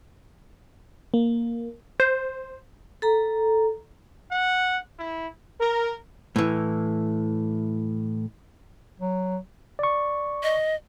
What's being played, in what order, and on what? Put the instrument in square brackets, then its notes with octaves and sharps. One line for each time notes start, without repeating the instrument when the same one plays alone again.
[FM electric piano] A#3
[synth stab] C5
[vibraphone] A4 A#5
[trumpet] F#5
E4
[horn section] A#4
[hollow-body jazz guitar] A2 E3
[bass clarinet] F#3
[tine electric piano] D5 C#6
[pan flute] D#5